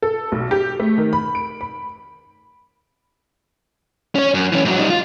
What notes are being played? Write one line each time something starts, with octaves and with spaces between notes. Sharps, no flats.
A4
B1
G4
A3
D#3
B5
D7
B5
C#4 C#5
F#2
E3 C#4
G#2 F#3
G3 D#4
F4